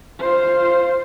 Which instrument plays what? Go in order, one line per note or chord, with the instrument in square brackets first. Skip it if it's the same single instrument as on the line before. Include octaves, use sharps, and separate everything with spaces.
[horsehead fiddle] F4 C5